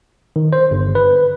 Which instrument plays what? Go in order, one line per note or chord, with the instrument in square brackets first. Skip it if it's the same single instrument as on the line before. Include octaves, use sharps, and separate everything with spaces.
[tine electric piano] D#3
C5
G1
B4